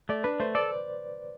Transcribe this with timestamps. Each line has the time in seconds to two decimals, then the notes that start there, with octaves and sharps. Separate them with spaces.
0.09 A3 D5
0.24 D4 B4
0.40 A3 C5
0.55 A4 D5